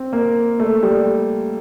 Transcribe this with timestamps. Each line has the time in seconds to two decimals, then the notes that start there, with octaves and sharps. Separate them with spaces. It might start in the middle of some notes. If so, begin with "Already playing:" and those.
Already playing: C4
0.13 A#3
0.60 A3
0.83 G3